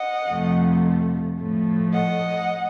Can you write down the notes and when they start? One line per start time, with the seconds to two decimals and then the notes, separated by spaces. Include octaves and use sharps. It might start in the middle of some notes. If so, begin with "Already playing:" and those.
Already playing: D#5 F#5
0.29 F2 C3 F3 A3
1.39 A2 F3 A3
1.93 D#5 F#5